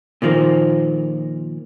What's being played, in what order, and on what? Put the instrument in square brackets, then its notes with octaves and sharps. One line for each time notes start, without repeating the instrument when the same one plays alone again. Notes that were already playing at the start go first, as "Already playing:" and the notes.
[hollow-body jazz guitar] A#2 D#3 F3 A#3